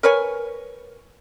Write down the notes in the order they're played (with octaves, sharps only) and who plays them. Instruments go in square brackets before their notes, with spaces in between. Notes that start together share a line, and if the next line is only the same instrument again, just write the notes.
[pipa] A#4 B4 C#5 G#5